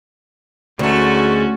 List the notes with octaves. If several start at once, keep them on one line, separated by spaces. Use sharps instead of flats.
D2 G#2 A3 C#4 F#4